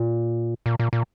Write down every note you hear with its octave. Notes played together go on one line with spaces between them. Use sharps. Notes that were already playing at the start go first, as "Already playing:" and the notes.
Already playing: A#2
A#2
A#2
A#2